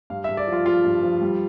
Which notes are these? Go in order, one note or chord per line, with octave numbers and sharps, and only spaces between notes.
G2 F5
G2 E5
D5
F3
F4
F3 F4
G2
F3
G3